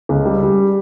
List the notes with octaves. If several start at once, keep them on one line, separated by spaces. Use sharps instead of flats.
C#2
G3
G3